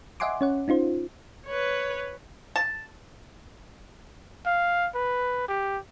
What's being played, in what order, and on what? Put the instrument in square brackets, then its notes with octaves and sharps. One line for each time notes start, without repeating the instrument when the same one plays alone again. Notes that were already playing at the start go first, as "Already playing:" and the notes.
[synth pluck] D#5 E5 F#5 G#5 C6 D6
C#4 C#5 F#5
C#4 D#4 F4 C5
[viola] B4 C#5
[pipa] A5
[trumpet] F5
B4
G4